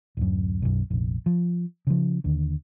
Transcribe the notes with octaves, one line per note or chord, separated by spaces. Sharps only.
D1 F#2
B1 F#2
F1 A#1
F3
C#3 F3
D#2 D3